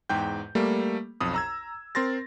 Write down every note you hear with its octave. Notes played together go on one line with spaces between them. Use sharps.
E2 G#2 G5 G6
G3 A3 A#3
B1 F2 D#6
A#5 E6 G#6
C4 A#4 C6 A6 A#6